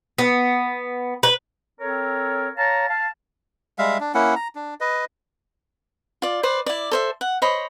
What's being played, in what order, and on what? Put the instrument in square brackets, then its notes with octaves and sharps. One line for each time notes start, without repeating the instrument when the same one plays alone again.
[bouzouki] B3
B4
[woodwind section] C4 A4 A#4 C#5
C#5 F5 A5 A#5
F5 A5
[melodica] G3 G#3 E5 F5
D4
A#3 C#4 E4 F#5
A#5
D4
B4 D#5
[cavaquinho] F4 D5
B4 C5 D5
E4 D5
A4 C5 E5
F#5
C5 C#5 D#5 B5